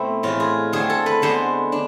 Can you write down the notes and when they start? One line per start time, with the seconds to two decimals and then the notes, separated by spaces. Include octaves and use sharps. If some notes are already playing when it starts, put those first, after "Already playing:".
Already playing: B2 A3 C4 E4
0.23 A2 E3 G#3 F4
0.40 G#4
0.73 D3 A3 C4 G#4
0.90 A4
1.06 B4
1.22 D3 G#3 B3 C5
1.72 D4